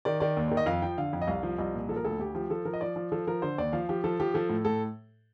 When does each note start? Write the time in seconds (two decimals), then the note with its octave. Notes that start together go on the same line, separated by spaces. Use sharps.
0.05 D#3 D5
0.20 D#3 D5
0.37 D#2
0.48 D#3 D5
0.57 D#5
0.66 F2 F5
0.82 F3 G5
0.98 D3 F5
1.13 F2
1.22 D#5
1.27 C2 F5
1.43 F3
1.58 C2 D#5
1.75 A#2
1.89 F3 A4
1.96 A#4
2.05 D2 A4
2.20 D2 G4
2.35 F3 G4
2.50 F3 A4
2.65 F3 A#4
2.74 D#5
2.81 F3 D5
2.96 F3
3.12 F3 A4
3.27 F3 A#4
3.42 D3 C5
3.58 D#2 D5
3.73 F3 F5
3.89 F3 G4
4.04 F3 A4
4.20 F3 G4
4.34 F3 A4
4.49 A2
4.65 A2 A4